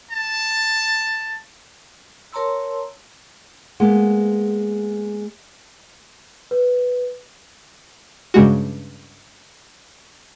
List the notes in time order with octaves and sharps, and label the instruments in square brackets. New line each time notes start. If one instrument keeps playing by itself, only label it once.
[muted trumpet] A5
[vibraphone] A#4 C#5 A5 A#5 C6 E6
[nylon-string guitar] G#3 A#3 B3
[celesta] B4
[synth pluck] G2 C#3 G#3 F#4